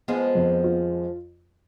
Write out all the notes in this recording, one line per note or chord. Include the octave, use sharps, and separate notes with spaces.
F3 G#3 B3
F2
F4